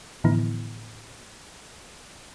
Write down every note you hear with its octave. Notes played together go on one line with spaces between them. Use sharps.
A2 D3 E3 F3 B3 E4